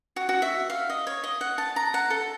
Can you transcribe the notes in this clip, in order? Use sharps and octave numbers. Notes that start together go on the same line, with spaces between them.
F#4
F#4
E5
F5
D#5
C#5
D#5
F#5
A5
A#5
F#5
A4